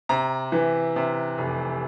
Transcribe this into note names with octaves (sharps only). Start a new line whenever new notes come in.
C3 A#5
E3
C3
F1